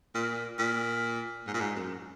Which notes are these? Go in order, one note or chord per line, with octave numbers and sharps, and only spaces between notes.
A#2
A#2
G#2
A#2
G#2
F#2